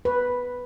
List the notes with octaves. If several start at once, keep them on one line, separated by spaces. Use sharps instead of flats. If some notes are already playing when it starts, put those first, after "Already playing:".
B4